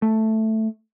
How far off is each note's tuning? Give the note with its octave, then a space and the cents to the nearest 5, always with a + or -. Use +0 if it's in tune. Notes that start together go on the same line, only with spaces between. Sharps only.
A3 +0